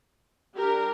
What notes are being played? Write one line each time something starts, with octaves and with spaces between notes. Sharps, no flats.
G3 D4 G4 A#4